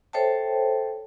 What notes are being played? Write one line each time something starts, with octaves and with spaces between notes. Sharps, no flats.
A4 C5 C#5 E5 G5 A5